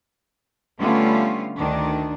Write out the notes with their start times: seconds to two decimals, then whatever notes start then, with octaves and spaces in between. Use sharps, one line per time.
0.79 D3 G3 A3 B3 C#4 F4
1.58 D2 D#3 D4